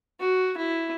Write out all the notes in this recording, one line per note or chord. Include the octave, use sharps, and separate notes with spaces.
F#4
E4